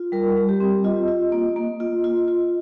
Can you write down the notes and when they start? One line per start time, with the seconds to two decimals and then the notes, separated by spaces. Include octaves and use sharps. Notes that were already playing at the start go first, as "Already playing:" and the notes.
Already playing: F4
0.12 G3 A#4
0.37 G3
0.49 G4
0.60 C4
0.84 F4 D#5
1.08 F4
1.32 A#3
1.56 A#3
1.80 F4
2.04 F4
2.28 F4